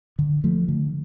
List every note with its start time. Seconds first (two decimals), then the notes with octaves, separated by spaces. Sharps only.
0.19 D3
0.44 F3 A3
0.68 D3